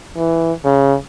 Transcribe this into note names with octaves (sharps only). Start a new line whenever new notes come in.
E3
C#3